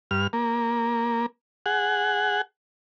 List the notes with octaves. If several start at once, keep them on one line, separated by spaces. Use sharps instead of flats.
G2 F6
A#3
G#4 F#5